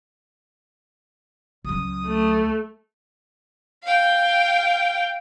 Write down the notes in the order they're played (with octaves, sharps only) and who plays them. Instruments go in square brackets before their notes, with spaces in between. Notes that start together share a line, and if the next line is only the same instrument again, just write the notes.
[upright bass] C#2 F#3 [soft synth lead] D#6
[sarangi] A3
[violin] F5 G5